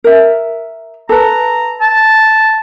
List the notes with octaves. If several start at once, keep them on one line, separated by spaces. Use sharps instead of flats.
A#4 E5
A4 B4 A#5
A5